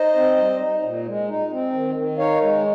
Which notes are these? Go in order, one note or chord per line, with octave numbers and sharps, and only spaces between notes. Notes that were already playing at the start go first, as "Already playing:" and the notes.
Already playing: D#4 C5 D#5
C4
G3
D#4
A#2
G#3
D#4
C4
D#3
D#3
D#4 C#5 F5
G#3